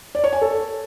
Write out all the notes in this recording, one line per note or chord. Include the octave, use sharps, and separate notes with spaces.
D5
C#5
G#5
A4